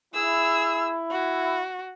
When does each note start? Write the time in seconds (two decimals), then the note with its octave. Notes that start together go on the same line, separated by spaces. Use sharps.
0.14 E4 G#4 E6
1.11 F#4